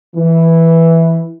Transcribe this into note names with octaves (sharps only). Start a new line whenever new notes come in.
E3